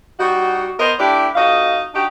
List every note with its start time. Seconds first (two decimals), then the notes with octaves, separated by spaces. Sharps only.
0.19 G3 D#4 F#4
0.79 B3 A#4 C5 D#5
1.00 A3 D4 E4 G4
1.36 F2 D#4 F#4 D#5 F5
1.94 D4 D#4 F#4 G4